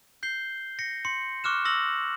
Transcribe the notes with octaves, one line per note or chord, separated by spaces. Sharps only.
G6 C7 G7
A#6 C#7
C6 C#7
C#6 D6 F6 F#6 E7
C#6 E6 A#6 F#7